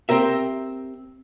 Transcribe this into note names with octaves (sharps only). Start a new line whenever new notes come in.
C4 G4 A#4 E5